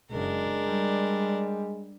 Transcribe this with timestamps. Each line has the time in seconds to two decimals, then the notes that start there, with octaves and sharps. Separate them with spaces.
0.11 F#1 G#3 D4 A#4
0.65 G3